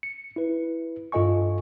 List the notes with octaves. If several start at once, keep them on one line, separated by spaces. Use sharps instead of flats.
C#7
E4 B4
G2 F4 A4 D#5 G#5 C#6